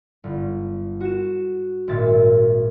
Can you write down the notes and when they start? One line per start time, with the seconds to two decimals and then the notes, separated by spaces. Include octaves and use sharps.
0.24 G1
1.01 F#4 E7
1.88 G#1 A#2 E5 A6